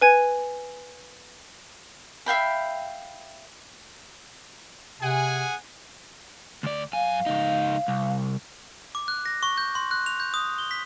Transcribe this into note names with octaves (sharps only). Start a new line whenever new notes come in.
B4 G#5 G#6
E5 F5 G5 B5
C3 G#4 F#5 G#5
D2 D5
F#2 F5 G#5
C#2 D#4
C2
D6
F#6
A#6
C#6
G6
C6
F#6
F7
G6
D#6
G7
B6